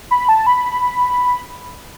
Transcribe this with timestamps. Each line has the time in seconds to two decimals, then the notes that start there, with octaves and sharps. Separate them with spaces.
0.11 B5
0.29 A5
0.47 B5